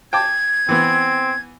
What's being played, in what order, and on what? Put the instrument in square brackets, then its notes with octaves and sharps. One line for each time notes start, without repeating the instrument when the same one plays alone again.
[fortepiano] G5 A5 D6 [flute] G#6
[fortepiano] E3 B3 [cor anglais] C4